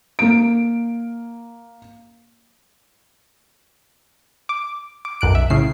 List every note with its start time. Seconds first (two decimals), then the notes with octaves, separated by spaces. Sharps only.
0.19 A#3 D7
4.49 D6
5.05 D6
5.21 B1 F#2 F#6 D7
5.35 E5
5.50 A2 C#3 C7